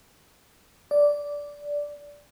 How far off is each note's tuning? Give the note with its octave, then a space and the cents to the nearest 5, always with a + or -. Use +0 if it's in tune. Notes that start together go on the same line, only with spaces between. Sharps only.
D5 -10